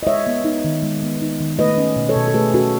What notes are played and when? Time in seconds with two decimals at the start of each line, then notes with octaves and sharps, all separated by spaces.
0.03 D#5
0.07 G#3 C#5 E5
0.27 B3
0.45 D#4
0.64 D#3
0.82 G#3
1.03 B3
1.22 D#4
1.40 D#3
1.59 A3 B4 D#5
1.78 C#4
1.96 B2
2.09 A4 C#5
2.16 B2
2.28 A4
2.34 A3 G#4 B4
2.54 C#4 F#4 A4